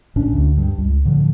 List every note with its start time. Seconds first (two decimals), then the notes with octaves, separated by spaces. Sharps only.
0.16 G#1 A2 C#4 D4
0.33 D2
0.58 G2
0.78 C#2
1.05 A2 D3 F3